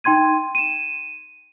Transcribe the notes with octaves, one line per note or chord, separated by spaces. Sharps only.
D#4 G5 C6 G#6 D#7
D#7 E7